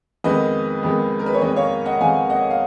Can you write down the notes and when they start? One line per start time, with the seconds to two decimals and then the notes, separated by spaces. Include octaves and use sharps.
0.24 F2 D#3 G#3 B3 B4 D#5
0.83 F2 D#3 G#3 B3
1.19 A#4
1.26 B4
1.34 C#5
1.41 F2 D#3 G#3 B3 B4 D#5
1.56 C#5 F5
1.85 D#5 F#5
2.00 F2 D#3 G#3 B3 F5 G#5
2.30 D#5 F#5
2.50 F5